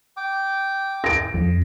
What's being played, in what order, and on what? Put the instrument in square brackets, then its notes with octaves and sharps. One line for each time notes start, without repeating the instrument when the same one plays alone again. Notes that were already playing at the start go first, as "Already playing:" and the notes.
[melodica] G5 D6
[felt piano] A#6 D7
[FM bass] F2